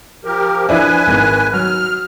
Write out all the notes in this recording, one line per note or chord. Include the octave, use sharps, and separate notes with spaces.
F3 G4 A#4
F3 D4 E4 B4 G#5
G#1 G#2
F#3 F6